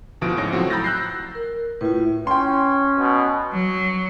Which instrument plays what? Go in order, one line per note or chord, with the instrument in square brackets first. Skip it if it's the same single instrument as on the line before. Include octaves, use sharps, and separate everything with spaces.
[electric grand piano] D2 B2 F3 E4 D7
C#2 G#2 C#5 A#6
A2 F3 F#3 C4 F#4
A#5 B5 E6 G6 A6 A#6
E6 F#6 G6 A#6 C7
[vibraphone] A#4
[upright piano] A2 [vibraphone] F4 B4
[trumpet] C#4 [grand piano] G5 C6
[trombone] B2
[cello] F#3